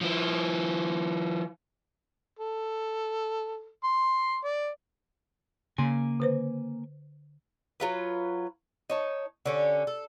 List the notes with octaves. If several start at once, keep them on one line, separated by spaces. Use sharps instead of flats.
F3 E4
A4
C6
D5
C#3 A#3 G#5 C6
D3 B4 C5
F#3 F4 B4
D#4 C#5 A5
D3 C#4 G4
A4